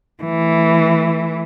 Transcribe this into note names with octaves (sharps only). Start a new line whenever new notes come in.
E3 A3